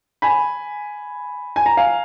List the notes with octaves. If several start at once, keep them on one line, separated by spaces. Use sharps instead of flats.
G#5 B5
G#5
A#5
F5 G#5